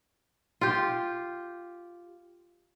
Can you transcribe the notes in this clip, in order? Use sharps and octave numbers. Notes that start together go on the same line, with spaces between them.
F4 G4